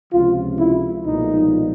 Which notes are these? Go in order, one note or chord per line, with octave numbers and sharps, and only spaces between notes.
C#2 C3 F3 F4
E4
B1 A#2 F3 G#3 D#4